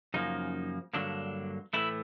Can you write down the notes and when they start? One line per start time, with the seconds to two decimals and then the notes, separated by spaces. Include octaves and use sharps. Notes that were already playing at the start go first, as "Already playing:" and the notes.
0.14 F#2 C#3 F3 A#3 D#4
0.93 G2 D3 F#3 A#3 D4
1.73 A2 E3 A3 E4